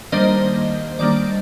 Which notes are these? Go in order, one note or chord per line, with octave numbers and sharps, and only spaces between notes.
D#3 G3 A#3 D4 C5 D#5
D#3 G3 A#3 D4 D5